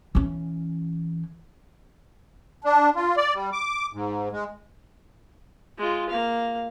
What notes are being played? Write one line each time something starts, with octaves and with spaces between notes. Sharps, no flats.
E3 C#4
D4
F4
D5
G3
D6
G#2
G#3
G#3 F4
A#3 F5